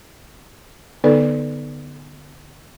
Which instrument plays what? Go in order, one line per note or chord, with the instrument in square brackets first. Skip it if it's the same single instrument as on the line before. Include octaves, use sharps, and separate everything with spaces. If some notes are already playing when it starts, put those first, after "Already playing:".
[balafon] D3 B3 D#4 A4 B4 D5